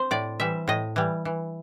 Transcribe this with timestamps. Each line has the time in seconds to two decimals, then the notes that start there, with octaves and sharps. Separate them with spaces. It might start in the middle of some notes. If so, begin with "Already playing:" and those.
Already playing: C4 C5
0.11 A2 D5
0.40 E3 G3 E5
0.68 A2 D#5
0.96 E3 G3
1.25 E3